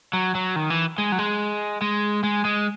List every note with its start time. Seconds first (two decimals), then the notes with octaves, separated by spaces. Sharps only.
0.13 F#3
0.35 F#3
0.56 D#3
0.70 E3
0.98 G#3
1.12 F#3
1.19 G#3
1.82 G#3
2.24 G#3
2.45 G#3